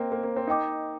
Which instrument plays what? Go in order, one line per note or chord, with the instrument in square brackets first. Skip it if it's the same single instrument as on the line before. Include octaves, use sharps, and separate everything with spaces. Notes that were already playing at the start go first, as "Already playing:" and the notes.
Already playing: [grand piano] A#3 C4 [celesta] C5 D#5 G5
[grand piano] A#3
A#3
C4
[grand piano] D#4 [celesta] A#4 D#5 G5 D6